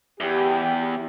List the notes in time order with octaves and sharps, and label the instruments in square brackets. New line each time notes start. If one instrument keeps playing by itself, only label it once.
[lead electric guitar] E2 [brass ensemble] G4